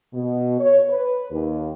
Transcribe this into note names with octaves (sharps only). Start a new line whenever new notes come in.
B2
C#5
B4
D#2